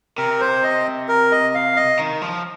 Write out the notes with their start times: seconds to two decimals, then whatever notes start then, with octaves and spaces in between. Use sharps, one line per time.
0.17 C3 A#4
0.41 C5
0.63 D#5
1.09 A#4
1.32 D#5
1.55 F5
1.76 D#5
1.99 D#3
2.22 F3